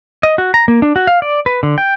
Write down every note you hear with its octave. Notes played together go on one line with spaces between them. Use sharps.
D#5
F#4
A#5
A#3
D4
F#4
F5
D5
B4
D3
G5